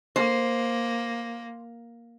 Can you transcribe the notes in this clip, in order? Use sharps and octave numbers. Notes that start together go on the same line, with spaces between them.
A#3 C5